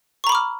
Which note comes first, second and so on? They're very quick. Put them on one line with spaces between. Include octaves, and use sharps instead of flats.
C#6 A#5 B5 D6 F6